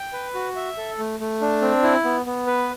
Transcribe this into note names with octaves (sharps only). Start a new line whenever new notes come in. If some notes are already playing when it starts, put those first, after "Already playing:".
Already playing: G5
B4
F#4
E5
A4
A3
A3
D4
C4
E4
B3
B3
B4